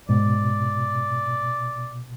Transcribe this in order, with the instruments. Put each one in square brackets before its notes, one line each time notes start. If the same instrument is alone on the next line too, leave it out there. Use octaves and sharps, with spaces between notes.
[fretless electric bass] G#2 [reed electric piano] B2 [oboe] D5